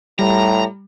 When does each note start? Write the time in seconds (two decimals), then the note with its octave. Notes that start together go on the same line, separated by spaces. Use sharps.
0.19 A2 G3 A#5